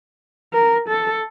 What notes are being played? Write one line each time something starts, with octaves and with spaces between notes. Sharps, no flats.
A#4
A4